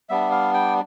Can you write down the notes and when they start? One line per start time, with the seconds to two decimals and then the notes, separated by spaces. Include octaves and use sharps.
0.09 G3 B3 D4 E5
0.31 F5
0.54 G5